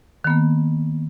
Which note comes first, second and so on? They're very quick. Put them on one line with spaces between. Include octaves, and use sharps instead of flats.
D#3 B3 A#3